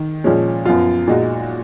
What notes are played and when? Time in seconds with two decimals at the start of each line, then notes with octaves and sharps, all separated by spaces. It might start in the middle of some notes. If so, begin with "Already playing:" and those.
Already playing: D#3
0.24 A#2 F3 G#3 C#4
0.66 F#2 F3 B3 F4
1.08 A#2 G#3 D#4 F#4